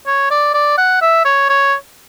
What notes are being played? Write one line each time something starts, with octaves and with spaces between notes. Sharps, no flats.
C#5
D5
D5
F#5
E5
C#5
C#5